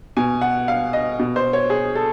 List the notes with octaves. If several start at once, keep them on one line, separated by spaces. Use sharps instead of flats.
B2 G#5
F#5
F5
D#5
B2
C5
C#5
G#4
A4